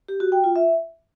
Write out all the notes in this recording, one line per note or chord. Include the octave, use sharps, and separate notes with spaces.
G4
F#4
G5
F4
E5